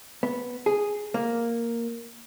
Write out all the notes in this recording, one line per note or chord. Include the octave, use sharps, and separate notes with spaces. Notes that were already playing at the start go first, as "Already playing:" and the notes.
B3
G#4
A#3